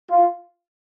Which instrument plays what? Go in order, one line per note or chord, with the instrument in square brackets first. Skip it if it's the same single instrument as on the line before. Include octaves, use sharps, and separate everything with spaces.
[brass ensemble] F4